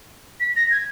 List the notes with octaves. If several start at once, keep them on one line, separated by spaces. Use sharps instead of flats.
B6
A#6
G#6